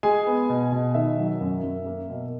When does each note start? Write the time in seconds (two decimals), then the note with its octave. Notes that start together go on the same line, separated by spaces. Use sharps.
0.03 G#3 G#4 G#5
0.27 B3
0.50 B2
0.72 B2
0.94 D#3 E5
1.18 F#3
1.41 F#2
1.63 F#2
1.86 A#3
2.10 B2